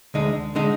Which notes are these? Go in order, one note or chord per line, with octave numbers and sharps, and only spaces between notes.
D2 D3 G#3 D#4
D3 G#3 D#4